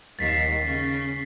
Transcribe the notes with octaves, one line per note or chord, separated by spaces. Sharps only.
D#2 A6 B6 C7
C#3 C#4